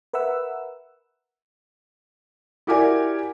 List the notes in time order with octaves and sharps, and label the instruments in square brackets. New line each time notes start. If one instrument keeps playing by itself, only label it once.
[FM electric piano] A#4 B4 E5 F#5 E6
[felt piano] E4 F#4 G4 A#4 D5 G#5